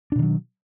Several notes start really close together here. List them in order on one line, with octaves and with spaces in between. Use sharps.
D4 B2 D#3 F#3